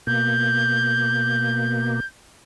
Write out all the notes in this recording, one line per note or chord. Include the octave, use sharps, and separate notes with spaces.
B2 A#3 G6